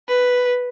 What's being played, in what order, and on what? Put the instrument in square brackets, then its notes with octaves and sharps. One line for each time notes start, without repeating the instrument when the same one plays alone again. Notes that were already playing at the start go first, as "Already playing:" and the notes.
[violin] B4